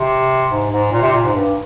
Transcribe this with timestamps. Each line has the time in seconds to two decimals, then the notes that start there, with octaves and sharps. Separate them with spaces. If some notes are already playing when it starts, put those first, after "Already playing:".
Already playing: C3
0.50 G#2
0.71 G#2
0.92 A#2
1.02 C3
1.13 A#2
1.24 G#2
1.34 G2